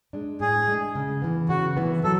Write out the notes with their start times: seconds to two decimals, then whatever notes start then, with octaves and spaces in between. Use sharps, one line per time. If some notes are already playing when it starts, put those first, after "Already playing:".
0.13 G#3 D4
0.40 A2 G#4
0.68 G#3 D4
0.95 C#3
1.22 E3 B3
1.49 C#3 F#4
1.77 E3 B3
2.04 F#3 A4